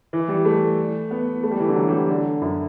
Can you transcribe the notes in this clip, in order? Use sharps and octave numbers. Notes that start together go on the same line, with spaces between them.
E3
G3
A3
B3
A3
G3
E3
D3
F#3
G3
F#3
D3
F#2